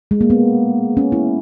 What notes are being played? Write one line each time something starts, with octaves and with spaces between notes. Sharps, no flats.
G#3
A#3
B3
C#4
E4